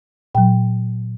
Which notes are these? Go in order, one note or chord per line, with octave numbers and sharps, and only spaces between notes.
A#2 F#3 G5